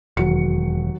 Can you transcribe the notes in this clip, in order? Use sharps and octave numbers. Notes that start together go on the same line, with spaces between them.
E1 D#2 F#3 C#7